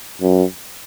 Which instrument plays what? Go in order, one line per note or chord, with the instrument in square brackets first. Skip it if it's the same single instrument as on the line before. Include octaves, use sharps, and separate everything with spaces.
[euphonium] F#2